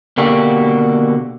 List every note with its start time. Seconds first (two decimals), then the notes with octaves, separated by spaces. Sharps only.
0.17 B2 D3 A#3 F#4 G4